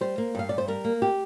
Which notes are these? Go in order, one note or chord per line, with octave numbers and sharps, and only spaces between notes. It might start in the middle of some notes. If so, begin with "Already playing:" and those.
G3 C5
A#3
G2 F5
G2 D5
C5
G3 A#4
A#3
G4